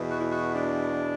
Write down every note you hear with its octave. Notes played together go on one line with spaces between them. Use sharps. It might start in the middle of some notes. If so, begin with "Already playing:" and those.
Already playing: E2 B2
F#4
E4
F#4
D4